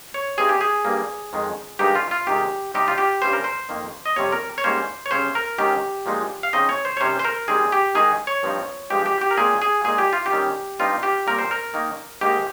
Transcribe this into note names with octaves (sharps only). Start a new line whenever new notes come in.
C#5
G2 G3 C4 D#4 G#4
G4
G#4
G2 G3 A#3
F2 D#3 G#3
G2 D#3 G#3 D#4 G4
F4
F4
C3 D#3 G#3 G4
C3 G3 C4 D#4 G4
F4
G4
G2 G3 C#4 C5
A#4
C5
F2 D#3 A#3
D#5
F2 C3 G3 C4 C#5
A#4
C#5
G#2 G3 A#3 C#4 C5
C#5
C#3 G3 C#4 C5
A#4
G#2 D#3 G#3 C#4 G4
A#2 F3 G#3 D#4
F5
C#3 F3 C4 D#4 D#5
C#5
C5
C#5
C3 D#3 G3 C#4 C5
C5
A#4
D#3 G3 C4 G#4
G4
D#3 G#3 D#4 G#4
C#5
G2 F3 C4 D#4
G2 F3 G#3 G4
G4
G4
A#4
A#2 G#3 C4 G#4
G#4
A#2 G#3 D#4 G#4
G4
F4
G4
D#3 G3 C#4
G2 G3 C4 D#4 F4
G4
A#2 G3 C4 A#4
C5
A#4
D#3 A#3 D#4
G#2 D#3 A#3 D#4 G4